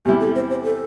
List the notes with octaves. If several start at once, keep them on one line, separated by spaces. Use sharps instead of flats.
E2 C3 G3 E4 G4
A4
C5
C5
A4